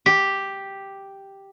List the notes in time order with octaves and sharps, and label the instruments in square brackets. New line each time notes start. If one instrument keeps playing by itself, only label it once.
[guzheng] G4